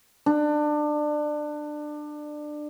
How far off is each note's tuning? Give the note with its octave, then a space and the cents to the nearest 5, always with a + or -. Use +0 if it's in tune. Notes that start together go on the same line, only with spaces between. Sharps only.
D4 +25